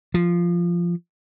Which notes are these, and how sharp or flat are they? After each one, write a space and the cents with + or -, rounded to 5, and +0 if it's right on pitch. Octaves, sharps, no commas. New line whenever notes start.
F3 -10